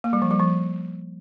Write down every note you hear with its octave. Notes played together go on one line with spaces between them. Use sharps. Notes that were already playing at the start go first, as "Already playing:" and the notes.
A#3
G3
F3
G3
F3